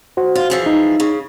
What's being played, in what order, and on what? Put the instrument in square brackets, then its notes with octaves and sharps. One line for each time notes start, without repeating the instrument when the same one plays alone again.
[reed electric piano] F#4 C5
[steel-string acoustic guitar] F4
E3 F3 G#4
[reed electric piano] D#4
[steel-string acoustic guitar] C#3